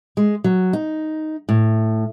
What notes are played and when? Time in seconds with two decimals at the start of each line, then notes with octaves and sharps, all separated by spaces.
0.17 G#3
0.44 F#3
0.73 D#4
1.49 A2